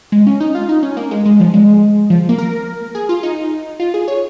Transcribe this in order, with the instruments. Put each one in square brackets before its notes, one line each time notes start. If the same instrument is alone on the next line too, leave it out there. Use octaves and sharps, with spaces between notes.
[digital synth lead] G#3
C#4
D#4
F4
D#4
C#4
A#3
G#3
G#3
F3
G#3
F3
A#3
A#4
G#4
F4
D#4
F4
G#4
C#5